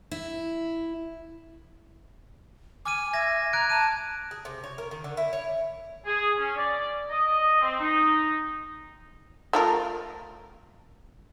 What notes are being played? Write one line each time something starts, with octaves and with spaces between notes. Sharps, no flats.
E4
G#5 D6 F6 D#7
E5 G#6 A#6
A#5 F#6 G#6 D7
A5 D#7
G#4
C3
C#5
A#4
D#3
D3
E4
C#5
G#4
C#4
D5
D#5
C4
D#4
A3 F4 A#4